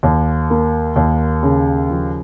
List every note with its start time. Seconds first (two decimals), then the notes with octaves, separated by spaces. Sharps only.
0.03 D#2
0.50 A#3
0.96 D#2
1.43 C#3
1.90 F3